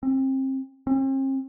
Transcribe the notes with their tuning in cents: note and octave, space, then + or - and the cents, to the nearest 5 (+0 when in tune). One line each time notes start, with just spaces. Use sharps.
C4 +30
C4 +45